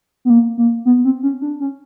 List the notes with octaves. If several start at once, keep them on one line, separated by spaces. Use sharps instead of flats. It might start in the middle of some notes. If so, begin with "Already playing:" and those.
B3
A#3
A#3
B3
C4
C#4
D4
C#4